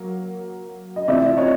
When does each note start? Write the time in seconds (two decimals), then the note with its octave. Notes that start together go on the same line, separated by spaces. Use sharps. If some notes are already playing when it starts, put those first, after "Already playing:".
Already playing: F#3 A#3
0.96 D#5
1.08 C3 E3 A3 C4 F4 D5 E5
1.37 C#5 D#5